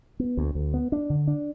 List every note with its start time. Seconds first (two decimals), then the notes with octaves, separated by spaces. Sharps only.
0.20 B3
0.37 D2
0.55 D2
0.74 B3
0.92 D4
1.10 D3
1.28 D4